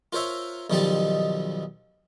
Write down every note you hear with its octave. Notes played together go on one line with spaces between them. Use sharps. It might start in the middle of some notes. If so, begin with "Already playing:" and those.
F4 A#4 C5 C#5 E5
B1 D#3 F3 G3 D#4 A5